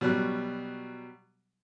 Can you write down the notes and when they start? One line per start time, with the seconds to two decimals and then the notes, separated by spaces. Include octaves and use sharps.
0.01 B2 F#3 G3 F#6